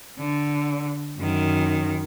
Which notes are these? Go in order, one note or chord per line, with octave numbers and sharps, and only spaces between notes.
D3
F#2 D#3